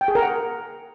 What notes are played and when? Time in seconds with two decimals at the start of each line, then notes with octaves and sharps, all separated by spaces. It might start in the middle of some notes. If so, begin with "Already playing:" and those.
0.01 G5
0.08 G#4
0.15 A#4
0.22 F#5